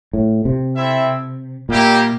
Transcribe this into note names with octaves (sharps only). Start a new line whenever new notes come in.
A2
C3
C4 E4 A4 E5
A#2 G3 A#3 E4 G4